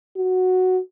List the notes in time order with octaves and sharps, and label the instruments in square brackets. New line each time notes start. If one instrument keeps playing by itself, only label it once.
[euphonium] F#4